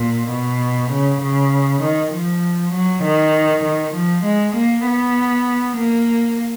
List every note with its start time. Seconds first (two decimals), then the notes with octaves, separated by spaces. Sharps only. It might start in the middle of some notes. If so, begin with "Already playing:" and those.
Already playing: A#2
0.32 B2
0.92 C#3
1.23 C#3
1.83 D#3
2.13 F3
2.74 F#3
3.04 D#3
3.65 D#3
3.95 F3
4.25 G#3
4.56 A#3
4.87 B3
5.78 A#3